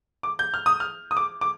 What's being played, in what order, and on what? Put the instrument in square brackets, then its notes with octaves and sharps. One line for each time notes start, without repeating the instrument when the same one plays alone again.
[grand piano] D6
G6
F6
D#6
F6
D#6
D6
D6